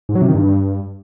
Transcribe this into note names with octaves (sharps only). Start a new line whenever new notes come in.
G#2
F#3
C3
D#3
G2